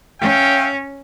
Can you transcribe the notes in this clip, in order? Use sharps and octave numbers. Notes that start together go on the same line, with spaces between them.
C#4 E5 F5 G5